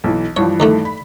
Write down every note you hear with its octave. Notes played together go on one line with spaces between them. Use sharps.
B1 E3
G2 E3 F3 C#5
D#2 D3 A3
B5